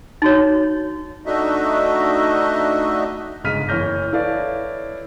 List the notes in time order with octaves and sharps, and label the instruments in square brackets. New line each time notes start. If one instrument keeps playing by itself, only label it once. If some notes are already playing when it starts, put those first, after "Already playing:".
[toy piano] D#4 F#4 C#5
[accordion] A3 D4 D#4 F#4 D#5 E5
[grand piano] G1 G#2 C#3 F6 B6 D#7
F#1 E3 C#5 F6 G6 A#6
E4 A4 B4 C#5 D5 F5